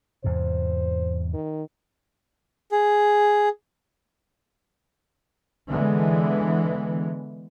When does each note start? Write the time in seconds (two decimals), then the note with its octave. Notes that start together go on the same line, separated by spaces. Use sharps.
0.24 E2 G#2 C3 C5
1.34 D#3
2.71 G#4
5.68 D3 E3 G#3 B3